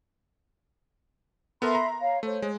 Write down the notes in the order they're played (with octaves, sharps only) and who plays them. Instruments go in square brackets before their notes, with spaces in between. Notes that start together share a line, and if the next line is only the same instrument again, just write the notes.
[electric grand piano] B3 A4 A#4 [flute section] E5 B5 C6
[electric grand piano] A#5
[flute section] C#5 F5
[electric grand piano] A3 [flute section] C5 C#5
[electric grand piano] G#3